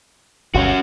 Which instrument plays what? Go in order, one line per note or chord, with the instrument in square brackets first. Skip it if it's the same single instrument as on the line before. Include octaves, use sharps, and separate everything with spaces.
[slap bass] G1 D2 B2 [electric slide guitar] C#4 F#4